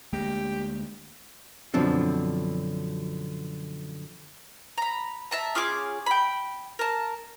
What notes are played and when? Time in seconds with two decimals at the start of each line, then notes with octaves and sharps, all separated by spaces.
0.13 D2 G#3 A#3 G4
1.74 F#2 B2 D3 F3 C4 D4
4.78 A#5 B5
5.31 E5 A5 A#5
5.55 C#4 F4 G#4 D6
6.06 G5 B5
6.79 A#4 A5